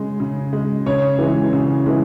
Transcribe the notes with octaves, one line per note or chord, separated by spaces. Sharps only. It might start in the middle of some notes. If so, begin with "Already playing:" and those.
Already playing: C#3 G#3
C#3
G#3
C#3 C#5
E3 G#3
C#3
E3 G#3